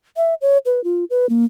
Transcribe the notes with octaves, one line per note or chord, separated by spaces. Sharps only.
E5
C#5
B4
F4
B4
A#3